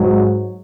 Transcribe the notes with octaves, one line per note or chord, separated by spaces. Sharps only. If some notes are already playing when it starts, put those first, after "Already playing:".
Already playing: G#2 F#3